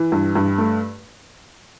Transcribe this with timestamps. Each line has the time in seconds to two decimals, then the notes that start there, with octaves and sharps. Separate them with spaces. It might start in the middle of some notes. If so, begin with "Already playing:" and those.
Already playing: E3
0.12 G2
0.35 G2
0.58 A3